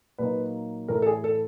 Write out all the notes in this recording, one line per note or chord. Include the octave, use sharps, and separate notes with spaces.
A#2 F#3 A#3 D#4 B4
A2 E3 A3 A#4
A4
G#4
A4